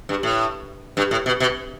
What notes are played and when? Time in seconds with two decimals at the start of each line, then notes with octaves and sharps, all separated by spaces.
0.09 G2
0.23 A2
0.97 G2
1.11 A2
1.26 B2
1.40 B2